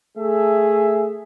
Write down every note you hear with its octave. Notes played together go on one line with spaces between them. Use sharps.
A3 G#4 E5